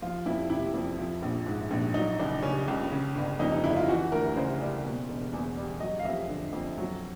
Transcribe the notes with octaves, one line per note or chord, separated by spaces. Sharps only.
F3 F4
F2 E4
C3 E4
F2
F3
A#1
G#2
A#1
F#3 D#4
C#2 D4
C#3 C#4
C#2
C#3
G1
F2 D#4
D#4
G1 E4
F4
E3 F#4
D2 A#4
C#3 C5
G3
B2
E1
E2
G3
F#3 D#5
F5
F2 E5
D3
F2
F#3